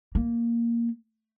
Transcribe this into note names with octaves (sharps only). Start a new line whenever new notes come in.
A#3